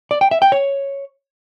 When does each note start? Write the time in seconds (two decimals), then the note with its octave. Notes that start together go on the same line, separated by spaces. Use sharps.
0.11 D5
0.21 G5
0.31 E5
0.42 G5
0.52 C#5